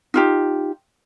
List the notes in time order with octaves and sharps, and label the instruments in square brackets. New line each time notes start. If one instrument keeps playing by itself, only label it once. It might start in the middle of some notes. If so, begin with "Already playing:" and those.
[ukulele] D#4 F4 G4